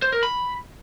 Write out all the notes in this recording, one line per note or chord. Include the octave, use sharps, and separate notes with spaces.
C5
A#4
B5